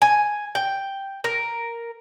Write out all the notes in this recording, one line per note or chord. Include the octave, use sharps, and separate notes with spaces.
G#5
G5
A#4